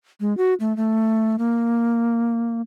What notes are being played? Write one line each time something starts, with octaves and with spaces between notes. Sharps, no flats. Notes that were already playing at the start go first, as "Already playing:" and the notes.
G#3
F#4
A3
A3
A#3